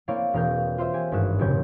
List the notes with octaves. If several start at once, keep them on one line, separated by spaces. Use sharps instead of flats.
A#3 C4 E4 C#5 D5 F5
E1 A#4 F5 G6
F4 C5 E5 C6
G4 G#5
G#1 G2 F#4 B4 F#6 E7
F1 A2 C#3 C4 C#5 G6